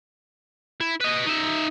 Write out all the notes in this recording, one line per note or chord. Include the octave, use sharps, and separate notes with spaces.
E4
B4 D#5
D#4 E5